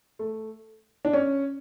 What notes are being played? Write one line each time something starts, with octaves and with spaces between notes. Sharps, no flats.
A3
D4
C#4